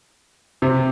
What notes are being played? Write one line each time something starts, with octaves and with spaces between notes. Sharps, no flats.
C3